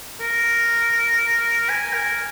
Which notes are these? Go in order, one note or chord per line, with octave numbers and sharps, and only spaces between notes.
A#4
G#5
A#4